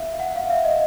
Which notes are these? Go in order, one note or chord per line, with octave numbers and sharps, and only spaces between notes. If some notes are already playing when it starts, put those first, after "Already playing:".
Already playing: E5 F5
F#5
F5
E5
D#5